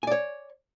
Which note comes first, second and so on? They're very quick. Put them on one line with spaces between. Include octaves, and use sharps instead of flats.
G#5 D5 C#5